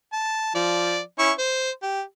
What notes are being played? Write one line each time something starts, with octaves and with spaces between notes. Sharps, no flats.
A5
F3 D5
C#4 E4 C#6
C5
G4